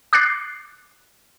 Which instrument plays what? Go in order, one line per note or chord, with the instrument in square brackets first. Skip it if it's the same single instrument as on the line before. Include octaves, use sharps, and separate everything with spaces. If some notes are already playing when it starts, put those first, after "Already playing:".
[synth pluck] D6 F#6 A6 C7